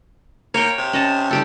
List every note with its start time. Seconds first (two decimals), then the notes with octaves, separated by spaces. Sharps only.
0.54 A#3 C#5 G5
0.78 C3
0.93 C#4 D#5 A5
1.31 G3 G4 A4